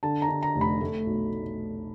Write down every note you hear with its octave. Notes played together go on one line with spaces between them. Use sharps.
D3 A5
A#5
D3
A#5
F1
B5
A3
B1